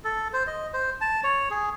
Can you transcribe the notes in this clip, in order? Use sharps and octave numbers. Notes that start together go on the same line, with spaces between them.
A4
C5
D#5
C5
A5
C#5
G#4